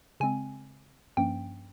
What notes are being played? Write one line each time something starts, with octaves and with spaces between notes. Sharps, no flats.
C#3 G#3 C4 G#5
G2 F3 A#3 C#4 G5